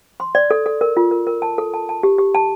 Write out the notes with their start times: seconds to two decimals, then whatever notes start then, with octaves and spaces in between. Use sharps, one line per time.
0.20 C6
0.35 D5
0.51 A4
0.66 A4
0.81 A#4
0.97 F4
1.11 A#4
1.27 A#4
1.42 A5
1.58 A4
1.74 A5
1.89 A5
2.03 G4
2.18 G4
2.35 A5